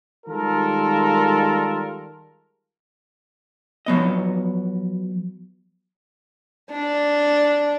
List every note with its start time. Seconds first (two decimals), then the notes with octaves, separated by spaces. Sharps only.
0.27 D#3 G3 G#3 F4 A4 A#4
3.86 F3 F#3 B3 D#5
6.72 D4